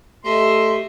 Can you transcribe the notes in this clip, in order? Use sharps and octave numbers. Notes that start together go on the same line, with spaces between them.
A3 G4 D#5 E5 C6